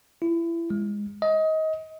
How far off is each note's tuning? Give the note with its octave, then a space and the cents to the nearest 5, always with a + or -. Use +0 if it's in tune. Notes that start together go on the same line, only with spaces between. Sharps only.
E4 +25
G#3 -15
D#5 +25